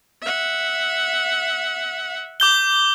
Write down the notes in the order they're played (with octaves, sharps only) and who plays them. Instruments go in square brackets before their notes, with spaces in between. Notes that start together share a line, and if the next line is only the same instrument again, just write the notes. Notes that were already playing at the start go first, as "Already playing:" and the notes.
[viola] E5 F#5
[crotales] D6 G6 G7